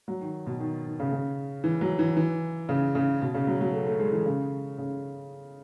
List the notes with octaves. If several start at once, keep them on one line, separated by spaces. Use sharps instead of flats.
F#3
D#3
B2
D#3
D#3
C#3
C#3
E3
F#3
E3
E3
C#3
C#3
B2
C#3
F#3
F#3
A3
A3
G#3
E3
C#3
C#3